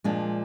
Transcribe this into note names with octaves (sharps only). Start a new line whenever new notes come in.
A#2 F3 G#3 D4